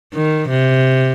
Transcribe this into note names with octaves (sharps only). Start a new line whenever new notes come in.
D#3
C3